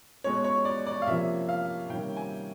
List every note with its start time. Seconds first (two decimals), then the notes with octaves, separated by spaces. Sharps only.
0.24 B2 G#3 C#4 C#5
0.44 C#5
0.65 D5
0.86 D5
1.02 F5
1.07 C3 F3 A#3 C#4 E5
1.48 F5
1.89 C3 D#3 G3 A#3 C#4 G5
2.17 G#5